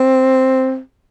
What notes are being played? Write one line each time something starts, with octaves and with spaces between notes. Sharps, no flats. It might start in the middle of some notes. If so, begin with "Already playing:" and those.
Already playing: C4